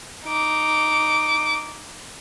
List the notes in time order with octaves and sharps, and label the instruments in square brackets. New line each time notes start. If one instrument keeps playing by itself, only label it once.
[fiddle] D#4 D6